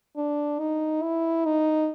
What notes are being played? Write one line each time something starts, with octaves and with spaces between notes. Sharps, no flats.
D4
D#4
E4
D#4